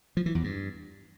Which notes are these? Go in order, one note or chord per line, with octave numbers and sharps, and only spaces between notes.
F3
E3
E2
G2